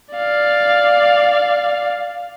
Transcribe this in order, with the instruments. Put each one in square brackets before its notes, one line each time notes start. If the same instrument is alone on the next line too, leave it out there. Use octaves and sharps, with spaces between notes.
[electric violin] D5 F5